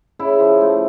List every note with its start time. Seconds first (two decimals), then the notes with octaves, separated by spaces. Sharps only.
0.19 C#3 E4
0.40 F3
0.61 A3